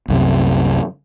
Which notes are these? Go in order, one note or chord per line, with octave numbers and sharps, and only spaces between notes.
C2 F#2 C3